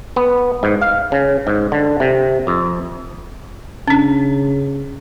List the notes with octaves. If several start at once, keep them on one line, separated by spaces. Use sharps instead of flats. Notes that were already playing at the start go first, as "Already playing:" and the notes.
B3
G#2
F5
C#3
G#2
D3
C3
F2
C#3 C#4 D4